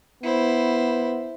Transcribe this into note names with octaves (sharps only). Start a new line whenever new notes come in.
B3 E4 C5